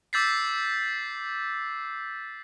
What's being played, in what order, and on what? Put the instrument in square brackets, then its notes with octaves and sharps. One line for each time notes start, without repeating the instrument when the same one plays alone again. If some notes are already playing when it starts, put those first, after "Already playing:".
[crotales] D6 E6 G6 A6 B6 C7